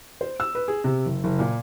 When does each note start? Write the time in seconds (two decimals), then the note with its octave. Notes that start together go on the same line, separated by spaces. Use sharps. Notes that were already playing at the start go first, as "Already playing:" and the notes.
0.21 C5
0.40 E6
0.55 B4
0.68 G#4
0.84 C3
1.06 F#1
1.24 F#1
1.39 A#2